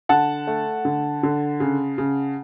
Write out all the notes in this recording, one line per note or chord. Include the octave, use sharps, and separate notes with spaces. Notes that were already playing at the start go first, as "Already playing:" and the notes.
D3 F#5 A5
A3
D3
D3
C#3
C#3